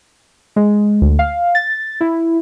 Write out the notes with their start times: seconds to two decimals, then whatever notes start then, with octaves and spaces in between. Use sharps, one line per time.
0.56 G#3
1.02 D2
1.19 F5
1.55 A6
2.01 E4